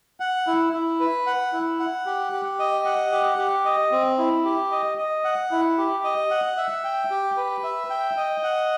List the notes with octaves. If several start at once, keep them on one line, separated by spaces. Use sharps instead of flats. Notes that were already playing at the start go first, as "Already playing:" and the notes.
F#5
E4
E4
B4
F#5
E4
F#5
G4
G4
D#5
F#5
G4
G4
D#5
C4
E4
G4
D#5
D#5
F#5
E4
G4
D#5
F#5
E5
G5
G4
B4
E5
G5
D#5
F#5